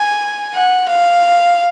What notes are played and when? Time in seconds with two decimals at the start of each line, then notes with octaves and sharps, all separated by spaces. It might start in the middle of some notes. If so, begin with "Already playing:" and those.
Already playing: G#5
0.54 F#5
0.89 F5